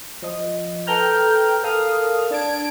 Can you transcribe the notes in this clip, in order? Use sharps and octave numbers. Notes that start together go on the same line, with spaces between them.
F3 D#5
A4 B4 G5 A#5 F6 G6
A4 A#4 F5 D#6 F6
D4 A5 G#6 D7